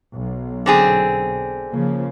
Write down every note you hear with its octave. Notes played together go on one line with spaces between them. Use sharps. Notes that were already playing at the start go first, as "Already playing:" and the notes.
B1
D3 C4 G#4
C#3 F3 A#3